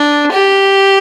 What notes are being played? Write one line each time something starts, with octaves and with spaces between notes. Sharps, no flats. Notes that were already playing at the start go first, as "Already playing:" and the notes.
Already playing: D4
G4